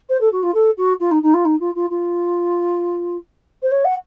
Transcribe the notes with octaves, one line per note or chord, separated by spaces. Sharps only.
C5
A4
F#4
F4
A4
F#4
F4
D#4
D#4
F4
D#4
F4
F4
F4
C5
C#5
F#5